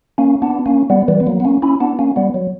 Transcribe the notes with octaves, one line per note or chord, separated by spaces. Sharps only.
A#3 C#4
B3 D4
A#3 C#4
G3 B3
E3 G3
B3
F#3 A#3
B3
A#3 C#4
C#4 E4
B3 D4
A#3 C#4
G3 B3
F#3